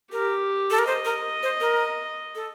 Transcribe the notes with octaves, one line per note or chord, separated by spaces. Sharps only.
G4 A#4
A4
A#4
C5 D#5
A#4
C5
A#4
A4